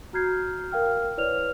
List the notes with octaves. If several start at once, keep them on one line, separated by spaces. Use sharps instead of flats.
F#4 A#5 F6 G6 G#6 C7
A#4 F5 G5 F6
E4 B4 C#5 D5 F6 F7